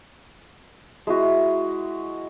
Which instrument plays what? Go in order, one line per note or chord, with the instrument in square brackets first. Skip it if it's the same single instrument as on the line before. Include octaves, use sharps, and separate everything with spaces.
[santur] G#3 E4 F#4